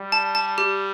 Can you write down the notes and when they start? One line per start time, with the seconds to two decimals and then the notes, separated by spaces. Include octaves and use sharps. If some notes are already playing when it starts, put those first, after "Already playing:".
Already playing: G3
0.12 A5
0.35 A5
0.58 G4